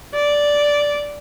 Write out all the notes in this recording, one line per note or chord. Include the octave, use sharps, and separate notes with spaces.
D5